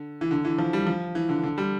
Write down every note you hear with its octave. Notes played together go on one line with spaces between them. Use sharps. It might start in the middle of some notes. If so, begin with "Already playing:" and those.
Already playing: D3
E3
D3
E3
F3
G3
F3
E3
D3
D3
G3